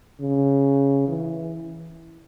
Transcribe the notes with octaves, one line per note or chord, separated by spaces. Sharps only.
C#3
E3